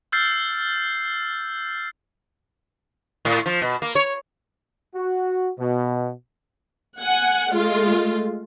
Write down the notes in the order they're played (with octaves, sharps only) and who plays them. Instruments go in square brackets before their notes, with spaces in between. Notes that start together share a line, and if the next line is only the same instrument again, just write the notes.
[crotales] E6 F6 G6 A6 C7
[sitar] A2
F3
B2
A#3
C#5
[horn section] F#4
B2
[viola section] F#5 G#5
G#3 A3 F4